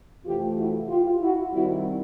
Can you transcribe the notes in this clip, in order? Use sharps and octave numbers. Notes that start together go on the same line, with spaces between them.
F2 C3 E3 A3 F4 G4
E4 F#4
F4 G4
E4 F#4
C3 D#3 G3 C4 E4 F#4